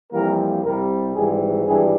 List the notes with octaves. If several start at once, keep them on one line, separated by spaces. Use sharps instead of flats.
F2 E3 G3 A#3 A#4
C2 C3 G3 A#4
G#1 G#2 E3 G3 G#4
G#1 G2 E3 G3 G#4